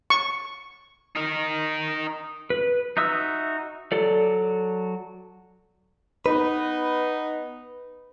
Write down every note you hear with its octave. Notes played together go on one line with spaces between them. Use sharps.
C#6
D#4 A#4
B4
D#4 F#4 E5 D#6 E6
F#3 A4 D5
B3 D#4 B4